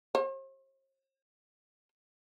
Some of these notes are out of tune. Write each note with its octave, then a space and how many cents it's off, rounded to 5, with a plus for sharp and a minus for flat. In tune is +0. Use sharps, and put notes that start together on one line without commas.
C5 +45